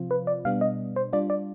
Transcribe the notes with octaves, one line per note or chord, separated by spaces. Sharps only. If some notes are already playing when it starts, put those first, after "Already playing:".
Already playing: C3 F3 C4 F4
B4
D5
B2 G3 B3 D4 F5
D#5
C5
G3 D4 F4 D5
D5